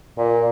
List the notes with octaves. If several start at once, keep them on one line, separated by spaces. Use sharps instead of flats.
A#2